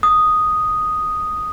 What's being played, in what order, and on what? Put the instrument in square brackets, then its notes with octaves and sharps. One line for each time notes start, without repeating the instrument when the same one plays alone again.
[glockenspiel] D#6